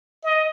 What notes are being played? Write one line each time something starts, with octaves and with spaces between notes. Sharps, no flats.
D#5